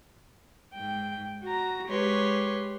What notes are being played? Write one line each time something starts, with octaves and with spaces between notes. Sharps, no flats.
G#2 G5
F#4 A#5
G#3 G4 B4 C#5 C6